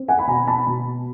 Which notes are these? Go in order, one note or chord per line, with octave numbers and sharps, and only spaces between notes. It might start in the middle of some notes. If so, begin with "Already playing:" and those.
Already playing: C4
F#5 G#5
B5
B2 G#5 A#5
A5 B5
B2